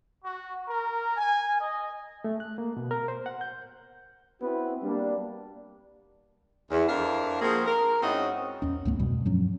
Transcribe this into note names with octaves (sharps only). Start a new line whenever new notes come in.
F#4
A#4
G#5
D#5
A3
F#6
A#3
B2
A#4
C5
F#5
G6
B3 C4 E4 F#4 B4
G3 A#3 D4
E2
F2 D4 E4 A#4 F5
F3 A#3 C4 F#4 G#4
A#4
G#2 C4 C#4 E4 F#4 D#5
E2 C#4
C#2 G#2 A3 B3
F2 B2 G3 C4
G2 F3 F#3 C#4